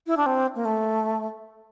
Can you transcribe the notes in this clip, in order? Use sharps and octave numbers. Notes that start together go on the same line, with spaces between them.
E4
D4
C4
A#3
A3